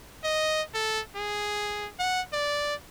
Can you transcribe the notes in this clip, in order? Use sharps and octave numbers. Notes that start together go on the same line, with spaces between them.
D#5
A4
G#4
F#5
D5